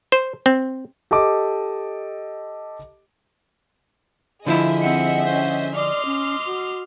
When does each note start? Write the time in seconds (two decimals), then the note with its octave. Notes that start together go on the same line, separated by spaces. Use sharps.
0.12 C5
0.46 C4
1.11 G4 A4 D#5 D6
4.46 D3 F3 E4 G#4 D#5 E5
4.82 C4 F#5 C#7
5.26 C#4 C5
5.75 D5 D#5 C6 D6 F6
6.05 C#4
6.46 F#4